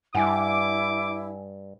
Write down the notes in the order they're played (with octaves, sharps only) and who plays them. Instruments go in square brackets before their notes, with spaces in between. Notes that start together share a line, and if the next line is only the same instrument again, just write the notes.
[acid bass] G2 [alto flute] E4 [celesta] F#5 G#5 [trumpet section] D6